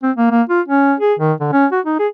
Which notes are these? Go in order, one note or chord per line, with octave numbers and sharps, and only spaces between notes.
C4
A#3
A#3
F4
C#4
G#4
D#3
D3
C#4
F#4
D#4
G#4